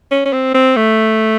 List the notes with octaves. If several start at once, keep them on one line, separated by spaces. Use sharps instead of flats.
C#4
C#4
C4
C4
A3